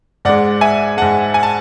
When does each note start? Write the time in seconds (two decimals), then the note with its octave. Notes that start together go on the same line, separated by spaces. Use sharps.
0.25 G#2 G#3 D5 F#5
0.61 E5 G#5
0.97 G#2 G#3 F#5 A5
1.34 G#5
1.43 A5